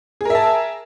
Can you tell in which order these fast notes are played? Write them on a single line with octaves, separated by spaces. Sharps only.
G#4 A#4 E5 A5